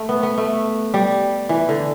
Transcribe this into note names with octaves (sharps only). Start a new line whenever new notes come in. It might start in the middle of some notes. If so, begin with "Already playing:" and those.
Already playing: A3
B3
B3
A3
G3
E3
D3